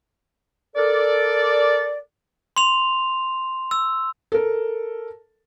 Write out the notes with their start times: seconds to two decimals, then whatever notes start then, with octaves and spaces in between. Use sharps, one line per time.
0.76 A4 A#4 D5
2.57 C6 F7
3.71 E6
4.32 A4 A#4